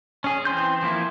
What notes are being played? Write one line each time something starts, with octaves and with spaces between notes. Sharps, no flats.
C#4 G#4
E3 C4 C6 G6
F3 A#3 E4